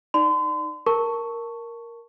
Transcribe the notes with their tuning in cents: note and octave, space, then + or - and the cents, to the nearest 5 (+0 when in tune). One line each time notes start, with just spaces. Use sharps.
D#4 +0 D5 +0 C6 -40
A#4 +0 A5 +15 C#6 +5